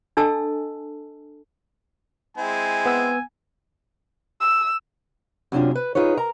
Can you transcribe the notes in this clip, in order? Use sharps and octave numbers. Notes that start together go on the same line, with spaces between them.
D4 A4 D#5 G#5 A5 E6
G#3 C4 E4 G#5
B3 F#5 E6
E6
F#2 C3 C#4 D4 F4
B4
D#4 F4 G#4 B4 C#5
A#4 A#5